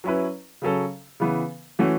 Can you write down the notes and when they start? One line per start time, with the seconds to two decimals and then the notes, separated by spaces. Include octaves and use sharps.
0.04 F#3 C#4 E4 B4
0.62 C#3 F#3 C#4 A4
1.20 C#3 E3 B3
1.79 E3 A3 C#4 F#4